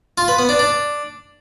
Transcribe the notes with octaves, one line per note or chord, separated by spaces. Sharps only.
F4
B4
B3
D4
D4